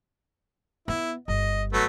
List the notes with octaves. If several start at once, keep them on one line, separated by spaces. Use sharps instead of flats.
B3 E4
G1 D#5
F#3 A3 B3